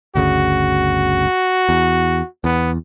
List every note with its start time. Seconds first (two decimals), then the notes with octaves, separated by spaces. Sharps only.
0.15 G1 D2 C#3 F#4
1.69 E2
2.44 E2 B3